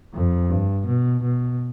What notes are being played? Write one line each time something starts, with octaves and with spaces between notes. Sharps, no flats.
F2
G2
B2
B2